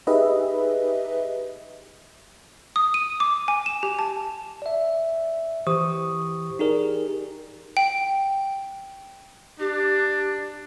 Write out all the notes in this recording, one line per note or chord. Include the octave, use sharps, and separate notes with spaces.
D#4 G4 G#4 B4 D#5 E5
D#6
D#7
D6
G#5
E7
G4
A5
D5 E5
E3 G4 C5 C#6 D#6
D#4 G4 G#4 A#4 D5
G5
D4 G4